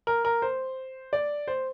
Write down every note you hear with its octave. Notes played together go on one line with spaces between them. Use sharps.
A#4
A#4
C5
D5
C5